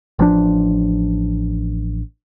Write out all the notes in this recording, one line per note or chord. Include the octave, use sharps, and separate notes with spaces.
A1 F3 D4